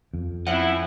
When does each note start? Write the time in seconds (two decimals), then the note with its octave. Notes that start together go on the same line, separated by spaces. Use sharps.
0.14 F2
0.47 F3 C4 C#4 E4 F#5